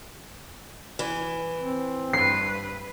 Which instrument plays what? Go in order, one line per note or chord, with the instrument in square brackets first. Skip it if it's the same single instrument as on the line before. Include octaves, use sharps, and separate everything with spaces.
[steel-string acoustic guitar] E3
[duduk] C4
[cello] G2 B4 [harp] C7